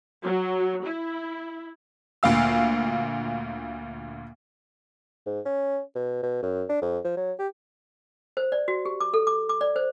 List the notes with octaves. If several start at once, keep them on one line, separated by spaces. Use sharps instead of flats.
F#3
E4
D2 A#2 F5 E6
G#2
C#4
B2
B2
F#2
D4
F2
F3
F#3
G4
C5
D5
F#4
G4
D6
A4
D6
D6
D5
C5